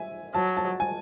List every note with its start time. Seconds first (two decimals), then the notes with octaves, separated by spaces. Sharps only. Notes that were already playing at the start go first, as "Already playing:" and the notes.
Already playing: E5 G#5
0.35 F#3 A5
0.57 A5
0.80 G#5